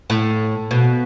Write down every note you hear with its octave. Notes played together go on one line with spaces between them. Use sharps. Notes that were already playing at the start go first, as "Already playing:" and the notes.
A2
B2